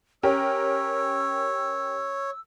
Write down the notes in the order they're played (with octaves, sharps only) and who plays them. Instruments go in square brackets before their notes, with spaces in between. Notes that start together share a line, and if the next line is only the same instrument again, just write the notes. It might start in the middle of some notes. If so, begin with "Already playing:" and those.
[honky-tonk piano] C#4 G4 A#4 [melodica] C#5 [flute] E6